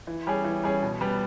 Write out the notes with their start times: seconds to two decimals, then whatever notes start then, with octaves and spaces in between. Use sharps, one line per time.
0.07 E3
0.27 G3 C#4 G#4
0.44 E3
0.63 G3 C#4 G#4
0.83 B2
1.01 G3 B3